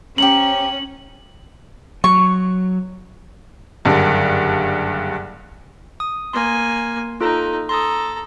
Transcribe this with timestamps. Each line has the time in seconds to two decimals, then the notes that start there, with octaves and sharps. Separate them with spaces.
0.18 C#4 G4 C5 A#5 F#7
2.04 F#3 C#6
3.85 F#1 G2 D3
6.00 D#6
6.33 A#3 G#5 C6
7.21 D#4 F4 A4 A#5
7.69 A4 A#5 C6 D#6